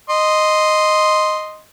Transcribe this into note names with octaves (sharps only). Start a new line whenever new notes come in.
D#5 C6